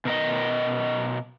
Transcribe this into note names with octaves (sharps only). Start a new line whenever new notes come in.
B2 A#4 D#5